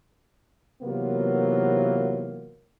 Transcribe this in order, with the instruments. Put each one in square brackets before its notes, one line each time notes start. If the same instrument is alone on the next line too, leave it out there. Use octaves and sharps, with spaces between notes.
[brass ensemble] C3 E3 F#3 A#3 B3 F4